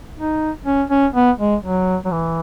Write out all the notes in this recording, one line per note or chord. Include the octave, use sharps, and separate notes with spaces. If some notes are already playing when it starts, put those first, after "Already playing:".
D#4
C#4
C#4
B3
G#3
F#3
F#3
E3